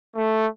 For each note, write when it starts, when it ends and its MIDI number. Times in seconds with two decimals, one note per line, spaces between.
0.15 0.46 57